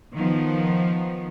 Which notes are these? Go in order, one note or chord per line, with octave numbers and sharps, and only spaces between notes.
D#3 F3 B3